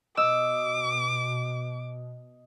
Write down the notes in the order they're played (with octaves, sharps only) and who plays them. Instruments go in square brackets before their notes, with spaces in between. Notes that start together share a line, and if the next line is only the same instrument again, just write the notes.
[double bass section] B2 [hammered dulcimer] D#5 [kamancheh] D6 [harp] E6